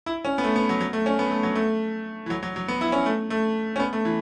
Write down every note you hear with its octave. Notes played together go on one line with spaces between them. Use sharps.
E4
C#4
B3
A3
B3
F#3
F#3
A3
C#4
B3
A3
F#3
A3
E3
F#3
F#3
F#3
B3
E4
C#4
A3
A3
C#4
B3
A3
E3